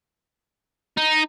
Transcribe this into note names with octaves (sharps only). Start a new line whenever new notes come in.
D#4